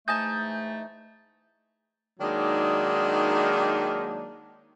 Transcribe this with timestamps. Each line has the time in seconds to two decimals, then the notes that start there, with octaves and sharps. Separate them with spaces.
0.08 G#2 E3 A3 D#4 G#5 A5 G6
2.19 D#3 F#3 G#3 A#3 D4 D#4